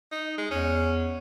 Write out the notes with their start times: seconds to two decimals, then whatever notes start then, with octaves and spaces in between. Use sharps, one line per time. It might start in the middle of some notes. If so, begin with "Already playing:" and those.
0.12 D#4
0.38 G#3
0.51 E2 C#4